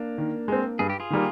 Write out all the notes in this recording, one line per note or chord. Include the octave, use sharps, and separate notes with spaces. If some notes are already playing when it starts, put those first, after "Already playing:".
Already playing: A#3 D4
D#3
G#3 C4
G2 G#4
G4
F4 G#4
D#3 G3 A#3